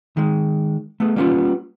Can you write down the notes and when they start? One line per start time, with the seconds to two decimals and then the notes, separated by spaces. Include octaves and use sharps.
0.17 D#3 G#3
1.00 A3 B3 G#4
1.16 G3 A#3 B3 C#4 D#4 F4